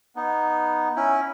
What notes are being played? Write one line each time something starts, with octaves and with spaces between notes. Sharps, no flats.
B3 D#4
C#4 E4